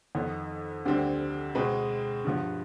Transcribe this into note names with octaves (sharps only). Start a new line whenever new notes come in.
F2 D#3 B3
D2 D3 G3 C4
B2 G#3 C4 B4
G2 F3 B3